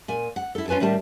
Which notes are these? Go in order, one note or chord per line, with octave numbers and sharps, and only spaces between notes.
A#2 G#5
F#5
E4 A4
C#4 F4 B4 G#5 A5
A2 D#3 G3 A5